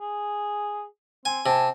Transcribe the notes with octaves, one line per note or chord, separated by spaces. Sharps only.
G#4
C4 G#5
C3 G#5 A5